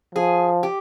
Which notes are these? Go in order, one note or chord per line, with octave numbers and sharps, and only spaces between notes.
F3 G#4
G4